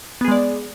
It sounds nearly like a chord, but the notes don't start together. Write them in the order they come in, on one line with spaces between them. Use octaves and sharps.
B3 G#4 G#3 D5